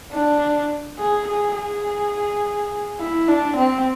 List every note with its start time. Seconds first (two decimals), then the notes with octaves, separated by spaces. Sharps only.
0.12 D4
0.98 G#4
1.27 G#4
1.56 G#4
2.99 E4
3.28 D4
3.56 C4